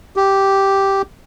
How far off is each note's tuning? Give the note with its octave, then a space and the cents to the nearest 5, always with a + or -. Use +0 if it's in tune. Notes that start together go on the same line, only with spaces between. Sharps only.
G4 -5